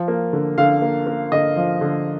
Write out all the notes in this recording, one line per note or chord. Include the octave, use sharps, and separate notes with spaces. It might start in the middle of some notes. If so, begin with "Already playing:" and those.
Already playing: F3
A#3
D3
D3 F5
A#3
A#3
D3 D#5
F3
D3